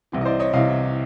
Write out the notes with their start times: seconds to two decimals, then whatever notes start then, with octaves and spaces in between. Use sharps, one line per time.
0.12 C2 C3 E3
0.21 D#5
0.25 C5 D5
0.40 C#5 D#5
0.53 C2 C3 E3 D#5 F5